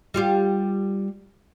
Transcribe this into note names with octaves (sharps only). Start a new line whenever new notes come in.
G3 F4 G4